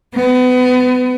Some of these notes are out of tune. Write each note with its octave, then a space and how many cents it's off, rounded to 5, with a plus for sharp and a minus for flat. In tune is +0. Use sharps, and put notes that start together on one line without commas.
B3 +30